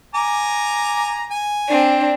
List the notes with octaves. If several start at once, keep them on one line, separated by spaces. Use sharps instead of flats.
G#5 A#5 D6
G#5
C4 D4